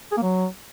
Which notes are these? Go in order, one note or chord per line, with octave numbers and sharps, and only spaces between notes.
G#4
A#3
F#3